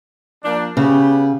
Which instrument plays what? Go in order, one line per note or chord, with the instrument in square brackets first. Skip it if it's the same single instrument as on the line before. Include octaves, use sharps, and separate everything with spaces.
[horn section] F3 A#3 D4
[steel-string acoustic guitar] C#3 [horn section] B3 C#4 G4